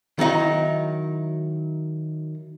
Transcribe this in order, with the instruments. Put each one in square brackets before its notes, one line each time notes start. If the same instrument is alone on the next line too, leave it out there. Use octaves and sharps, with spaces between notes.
[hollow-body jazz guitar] D#3 F#3 D#4 E4